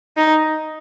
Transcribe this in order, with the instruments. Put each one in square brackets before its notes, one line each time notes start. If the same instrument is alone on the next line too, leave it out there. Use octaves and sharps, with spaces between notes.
[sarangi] D#4